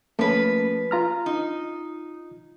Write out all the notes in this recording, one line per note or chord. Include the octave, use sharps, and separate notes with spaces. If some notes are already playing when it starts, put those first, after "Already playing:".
F3 A3 A#3 C#4 B4
F4 A#5 F6
D#4